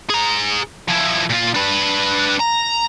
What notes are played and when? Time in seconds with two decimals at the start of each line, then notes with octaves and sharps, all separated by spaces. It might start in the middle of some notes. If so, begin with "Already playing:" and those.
0.10 G#4 A#5
0.88 F3 E4
1.30 A#2 F4
1.55 D4 B4
2.40 A#5